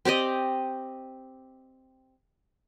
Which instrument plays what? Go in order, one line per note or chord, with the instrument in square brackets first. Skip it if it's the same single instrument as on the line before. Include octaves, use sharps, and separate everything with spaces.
[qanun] C4 G4 D5 D#5